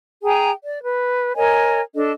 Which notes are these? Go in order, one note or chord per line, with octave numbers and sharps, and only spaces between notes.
G#4 G5 G#5 A#5
D5
B4
A#4 C#5 D#5 G#5
D4 A4 D#5